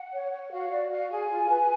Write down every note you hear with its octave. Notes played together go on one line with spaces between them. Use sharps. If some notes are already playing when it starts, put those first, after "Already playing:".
Already playing: F#5
C#5
C#5
F#4 F5
F#4 D5
F#4 F5
G#4 G#5
F4
B4